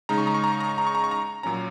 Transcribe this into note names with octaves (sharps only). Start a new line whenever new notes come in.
C#3 G#3 D#4 A#5
C#6
A#5
C#6
A#5
C#6
A#5
C#6
A#5
C#6
A#5
C#6
A#5
A#2 F#3 C#4 A#5